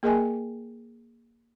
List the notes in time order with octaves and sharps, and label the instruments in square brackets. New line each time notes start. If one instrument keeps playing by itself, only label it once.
[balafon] A#3 G#4 A#4 D#5 G5 G#5